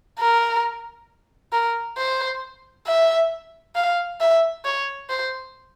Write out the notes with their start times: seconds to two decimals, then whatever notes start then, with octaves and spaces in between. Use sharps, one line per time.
0.19 A#4
1.53 A#4
1.98 C5
2.87 E5
3.75 F5
4.21 E5
4.65 C#5
5.09 C5